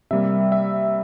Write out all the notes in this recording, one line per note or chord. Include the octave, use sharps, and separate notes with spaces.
C3 G3 A#3 E5
E5